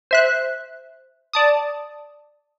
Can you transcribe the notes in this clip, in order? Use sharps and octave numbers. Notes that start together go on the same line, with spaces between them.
C5 E5 F#6
D5 A5 D#6